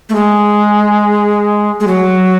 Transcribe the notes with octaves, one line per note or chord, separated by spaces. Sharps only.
A3
G#3
G#3
F#3